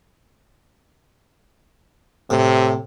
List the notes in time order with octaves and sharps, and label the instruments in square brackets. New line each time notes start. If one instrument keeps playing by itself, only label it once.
[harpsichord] A2 [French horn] C3